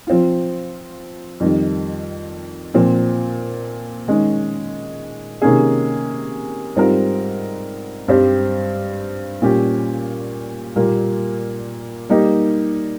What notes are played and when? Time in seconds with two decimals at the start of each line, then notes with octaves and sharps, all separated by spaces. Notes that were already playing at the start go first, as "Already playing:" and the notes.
0.07 F3 C4 F4
1.40 F2 D#3 G3
2.74 A#2 F3 C4
4.07 D#3 G#3 C#4
5.42 C3 D#3 A#3 C#4 G#4
6.76 G#2 G3 C4 F4 A#4
8.08 G2 G3 C4 G4 C5
9.42 A#2 G3 C#4 G4
10.76 A#2 G3 A#3
12.09 G3 A#3 D#4 G4